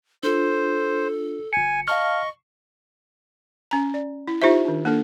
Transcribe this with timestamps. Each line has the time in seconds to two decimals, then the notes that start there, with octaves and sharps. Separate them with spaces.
0.23 D4 F4 A4 C5
1.53 G1 G#5 C#7
1.88 D#5 F5 A5 C#6 F6
3.71 C#4 A#5
3.94 D5
4.28 E4
4.42 D#4 F4 G4 C5 E5
4.65 D#3 D4
4.85 A#3 D4 A4